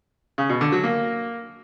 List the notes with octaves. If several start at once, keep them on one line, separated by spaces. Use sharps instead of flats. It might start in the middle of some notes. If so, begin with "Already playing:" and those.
C#3
B2
D3
F#3
A#3